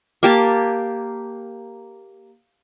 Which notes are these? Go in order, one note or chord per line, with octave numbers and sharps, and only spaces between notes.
A#3 G4 A5